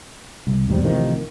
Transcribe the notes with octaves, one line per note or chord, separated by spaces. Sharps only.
C2
E2 G#2 C3 G3
A1 C3 D#3 F3